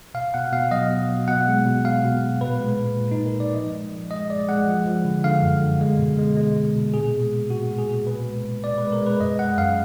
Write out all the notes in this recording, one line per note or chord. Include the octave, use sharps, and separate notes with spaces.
B2 F5
B2 F#5
B2 F5
F#3 D#5
B2
F#3
B2 F#5
G#3
B2
B2 F5
B2
B2
A#2 B4
G#3
A#2
A#2
A#2 D#4
A#4
A#2 D5
F3 D#5
G#3
F3
G#3 D#5
G#3 D5
G#3 F#5
F3
F3
D3
D3 F5
F#2
D3
G#3
B2
G#3
G#3
G#3
B2
A#2 G#4
G#3
G#3
A#2 F#4
G#3
G#4
A#2
B2 B4
G#3
G#3
B2 D5
G#3 B4
A#4
G#3
B4
F#2 D#5
G#3 F#5
F#2 F5